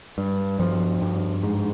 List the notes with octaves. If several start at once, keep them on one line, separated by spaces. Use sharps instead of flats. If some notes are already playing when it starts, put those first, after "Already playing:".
G2
G2 F3
G2
G#2